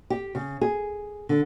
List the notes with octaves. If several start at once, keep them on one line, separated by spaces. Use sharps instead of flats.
G4
C#3
G#4
D3